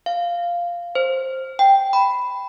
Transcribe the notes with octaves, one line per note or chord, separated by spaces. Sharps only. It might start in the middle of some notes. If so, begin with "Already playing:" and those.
F5
C5
G5
B5